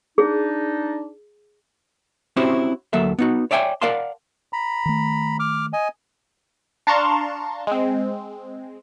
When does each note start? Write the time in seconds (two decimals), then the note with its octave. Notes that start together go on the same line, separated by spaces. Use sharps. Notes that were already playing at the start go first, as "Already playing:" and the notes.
0.18 D4 D#4 G#4
2.36 C4 C#4 E4 F#4 G4 C5
2.93 D2 F#3 A#3 A4 E5
3.19 B3 D#4 F#4
3.51 C#5 D5 E5 G5 G#5
3.82 A#4 D5 F5 F#5 A5 C6
4.53 A#5 B5
4.86 D#3 A3
5.40 D6 F6
5.73 D#5 G#5
6.87 D4 F5 A5 A#5 C6 C#6
7.67 G#3 C4